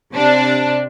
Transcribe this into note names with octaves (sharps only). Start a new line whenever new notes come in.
C3 D4